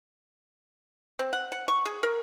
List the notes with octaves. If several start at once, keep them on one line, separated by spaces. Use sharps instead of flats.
C4
F#5
F#5
C#6
G#4
A#4